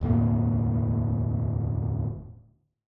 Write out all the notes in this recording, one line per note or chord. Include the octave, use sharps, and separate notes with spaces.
E1 D2 A2 A#3